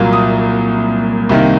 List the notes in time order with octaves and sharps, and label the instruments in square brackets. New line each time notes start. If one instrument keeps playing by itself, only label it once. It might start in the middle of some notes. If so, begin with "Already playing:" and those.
Already playing: [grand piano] C2 A#2 F#3 A#3
D#6
C2 C3 D#3 A#3